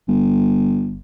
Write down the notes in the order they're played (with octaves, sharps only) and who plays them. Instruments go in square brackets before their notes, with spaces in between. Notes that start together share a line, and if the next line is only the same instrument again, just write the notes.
[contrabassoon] G1